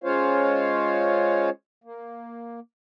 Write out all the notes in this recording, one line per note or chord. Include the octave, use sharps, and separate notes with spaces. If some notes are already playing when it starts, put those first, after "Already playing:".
G#3 C#4 F4 C5 C#5 F5
A#3